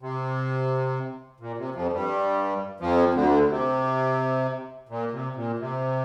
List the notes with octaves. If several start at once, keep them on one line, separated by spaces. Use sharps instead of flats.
C3
A#2
C3
F2 F3
G2 G3
F2 F3
D2 D3
C3
A#2
C3
A#2
C3